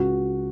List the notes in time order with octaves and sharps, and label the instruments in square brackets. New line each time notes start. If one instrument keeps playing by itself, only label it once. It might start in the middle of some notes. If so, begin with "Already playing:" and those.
Already playing: [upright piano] C#2 F#4